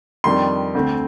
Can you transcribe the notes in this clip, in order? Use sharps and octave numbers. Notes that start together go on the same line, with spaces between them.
F2 D#3 G3 D4 C6
D2 D3 A3 C4